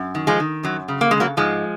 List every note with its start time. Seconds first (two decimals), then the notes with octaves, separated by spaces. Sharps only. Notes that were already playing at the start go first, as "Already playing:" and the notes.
Already playing: F#2
0.15 D#3
0.27 F3 G#3
0.40 D#3
0.63 F#2 F#3
0.88 C#3
1.01 A#3
1.11 C#3 G#3
1.20 F#3 A#3
1.37 G#2 F3 G#3